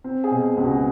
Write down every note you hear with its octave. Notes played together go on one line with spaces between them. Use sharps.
C4
G#4
B2
C#2
F#4